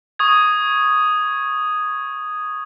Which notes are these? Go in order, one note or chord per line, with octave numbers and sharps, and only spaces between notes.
C#6 D#6 G#6